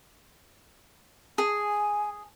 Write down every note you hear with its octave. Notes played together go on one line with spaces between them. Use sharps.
G#4 G#5